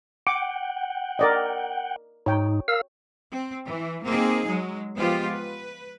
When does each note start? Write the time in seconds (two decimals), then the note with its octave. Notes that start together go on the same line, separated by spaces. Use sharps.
0.27 F#5 G5 D6
1.19 A#4 D5 D#5
2.26 G#2 D#4 C#5 G5
2.68 A#4 F5 E6
3.31 C4
3.67 E3
4.04 A#3 C4 D#4 G#4
4.46 F#3 G#3
4.96 F3 G#3 B3 F4 G4 C5
5.33 B4